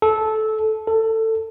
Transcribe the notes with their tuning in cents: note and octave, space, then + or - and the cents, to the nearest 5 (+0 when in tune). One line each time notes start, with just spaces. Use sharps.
A4 -15
A4 +20